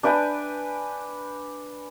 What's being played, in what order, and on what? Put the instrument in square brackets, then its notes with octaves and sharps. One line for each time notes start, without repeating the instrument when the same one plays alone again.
[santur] D4 B4 G5 G#5